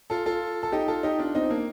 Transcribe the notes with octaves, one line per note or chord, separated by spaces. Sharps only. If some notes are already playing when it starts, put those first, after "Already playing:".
F4 A4
F4 A4
A4
D#4 G4
F4 A4
D#4 G4
D4 F4
C4 D#4
A#3 D4